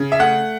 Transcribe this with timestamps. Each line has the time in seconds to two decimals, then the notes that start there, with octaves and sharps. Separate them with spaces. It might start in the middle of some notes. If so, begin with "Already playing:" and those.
Already playing: C#3
0.12 E5
0.19 A3 F#5